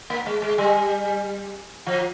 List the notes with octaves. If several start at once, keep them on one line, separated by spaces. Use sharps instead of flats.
A#3
G#3
G#3
G3
F3